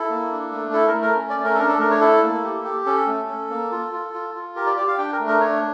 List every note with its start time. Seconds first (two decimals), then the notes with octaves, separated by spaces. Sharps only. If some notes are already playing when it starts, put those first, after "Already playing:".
Already playing: E4 A4
0.10 A#3
0.31 D4
0.52 A3
0.73 E4 A4
0.88 A#4
0.94 A3
1.02 A#4
1.16 C#4
1.30 D5
1.37 A3
1.44 A#4
1.55 A4
1.58 D4 A#4
1.69 A4
1.79 A3 A#4
1.91 C#5
2.01 E4 A4
2.23 A#3
2.44 G4
2.64 G4
2.86 C#4 A4
3.07 A3
3.28 C#4
3.50 A#3
3.71 F4
3.92 F4
4.13 F4
4.34 F4
4.56 G4 A#4
4.66 D5
4.77 G4 D5
4.88 F5
4.98 D4 G5
5.13 A#4
5.19 A3
5.27 A#4
5.41 D4 C#5